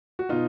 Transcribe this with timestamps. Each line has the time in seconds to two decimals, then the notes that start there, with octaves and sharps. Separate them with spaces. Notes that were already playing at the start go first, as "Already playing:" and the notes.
0.19 F#4
0.29 B2 D#4 F4